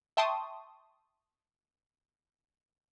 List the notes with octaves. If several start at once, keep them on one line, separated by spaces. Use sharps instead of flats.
E5 G5 A5 C6 C#6 D#6